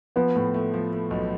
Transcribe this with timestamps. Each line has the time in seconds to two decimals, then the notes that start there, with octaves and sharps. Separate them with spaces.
0.16 F3 B3
0.36 A2
0.54 A3
0.74 F3
0.93 A3
1.11 B1